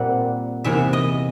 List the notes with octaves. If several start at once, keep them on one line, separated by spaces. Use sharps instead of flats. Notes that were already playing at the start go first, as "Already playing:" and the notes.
Already playing: A#2 G3 C4 F#5
E2 C3 E3 E5
D#5